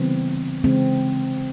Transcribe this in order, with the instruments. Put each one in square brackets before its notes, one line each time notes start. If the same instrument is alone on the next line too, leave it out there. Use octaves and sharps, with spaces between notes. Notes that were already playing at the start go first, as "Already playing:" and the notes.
Already playing: [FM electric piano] C#3 E3 G3 B3 [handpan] C4
[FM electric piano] C#3 E3 G#3 [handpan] C4